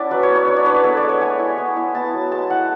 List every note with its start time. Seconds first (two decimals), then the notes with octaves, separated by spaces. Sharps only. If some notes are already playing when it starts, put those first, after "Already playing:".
Already playing: C#4 E4 D5 E5 F#5 A5 B5
0.11 F#3 B4
0.23 C#5
0.29 B3
0.35 C#5
0.47 D4 C#5
0.56 D5
0.65 D4 B4
0.75 C#5
0.84 B3 A4
0.97 D5
1.02 G#3
1.09 C#5
1.21 A3 G#5
1.39 E4
1.58 B3
1.76 E4
1.95 B3 A5
2.13 F#3
2.31 G#3 A5
2.50 E4 F#5